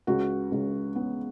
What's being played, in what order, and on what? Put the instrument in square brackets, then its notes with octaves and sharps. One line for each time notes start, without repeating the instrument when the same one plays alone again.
[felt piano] C#2 F#4
C#2
B3